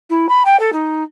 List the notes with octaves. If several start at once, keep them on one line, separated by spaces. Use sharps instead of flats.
E4
B5
G5
A4
D#4